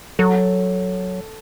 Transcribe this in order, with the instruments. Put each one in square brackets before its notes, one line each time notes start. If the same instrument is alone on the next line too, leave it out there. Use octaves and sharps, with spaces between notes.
[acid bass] F#3 [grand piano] A4